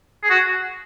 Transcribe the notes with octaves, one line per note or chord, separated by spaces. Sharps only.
G#4
F#4